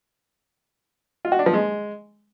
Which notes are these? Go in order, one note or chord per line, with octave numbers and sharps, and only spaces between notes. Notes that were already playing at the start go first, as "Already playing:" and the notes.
F4
F#4
D4
F3
G#3